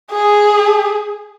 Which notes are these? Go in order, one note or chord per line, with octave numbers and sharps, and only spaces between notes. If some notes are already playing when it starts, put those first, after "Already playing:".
G#4